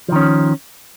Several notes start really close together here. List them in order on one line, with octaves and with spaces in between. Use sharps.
F3 D#3 C#4